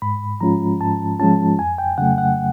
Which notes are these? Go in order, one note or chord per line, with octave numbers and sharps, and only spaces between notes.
G#2 B5
F3 G#3 C#4 F4 A#5
G#2 A5
F3 G#3 C#4 F4 A5
F2 G#5
G5
C#3 F#3 A3 F#5
F#5